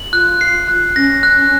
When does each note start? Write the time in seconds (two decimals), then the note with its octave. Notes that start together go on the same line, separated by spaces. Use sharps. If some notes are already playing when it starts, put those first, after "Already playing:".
Already playing: F#7
0.13 F4 F#6
0.41 C7
0.68 F#6
0.96 C#4 A#6
1.23 F#6